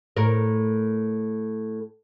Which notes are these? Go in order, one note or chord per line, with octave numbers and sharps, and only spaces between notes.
A2 A#4